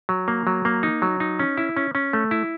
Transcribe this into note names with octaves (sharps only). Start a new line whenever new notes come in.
F#3
A#3
F#3
A#3
D#4
F#3
D#4
C#4
E4
C#4
C#4
A3
E4